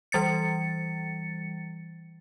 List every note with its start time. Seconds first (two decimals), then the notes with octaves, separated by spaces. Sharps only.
0.12 E3 G3 A6 C#7